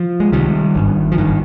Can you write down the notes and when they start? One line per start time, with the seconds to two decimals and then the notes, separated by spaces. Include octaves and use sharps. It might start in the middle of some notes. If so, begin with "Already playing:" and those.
Already playing: F3
0.20 G#3
0.32 C#2 C3 D#3 G3
0.75 G#1 G2
1.12 F3
1.17 G#1 G2 D#3